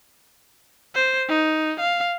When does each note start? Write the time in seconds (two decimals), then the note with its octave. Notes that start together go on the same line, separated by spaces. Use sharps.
0.95 C5
1.29 D#4
1.80 F5